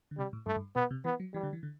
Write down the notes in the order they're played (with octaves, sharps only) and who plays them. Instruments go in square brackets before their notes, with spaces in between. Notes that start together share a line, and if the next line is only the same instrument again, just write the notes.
[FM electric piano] D3
[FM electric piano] C3 [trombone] G3
[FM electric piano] A2
[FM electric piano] G2 [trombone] A3
[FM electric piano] G2
[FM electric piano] B2 [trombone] B3
[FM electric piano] C3
[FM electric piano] E3 [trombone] B3
[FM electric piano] F#3
[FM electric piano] E3 [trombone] G3
[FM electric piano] D3
E3
D3